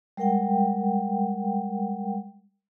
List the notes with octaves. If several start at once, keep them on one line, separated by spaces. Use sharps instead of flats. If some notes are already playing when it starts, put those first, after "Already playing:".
G3 G#3 A#4 F#5 G5